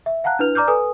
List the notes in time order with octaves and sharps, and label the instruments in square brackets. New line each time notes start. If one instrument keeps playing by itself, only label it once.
[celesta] E5
F5 F#5 A5 A#5 F#6
D4 E4 B4 F6 F7
D5 A#5 D6 F6 G6
A4 B4 G#5 D#6